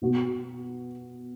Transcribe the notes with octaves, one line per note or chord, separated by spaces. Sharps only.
B2 B3 F#4